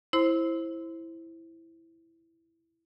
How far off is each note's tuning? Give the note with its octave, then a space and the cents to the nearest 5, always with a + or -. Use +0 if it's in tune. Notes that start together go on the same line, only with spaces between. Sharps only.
E4 +0 C5 +15 C6 -30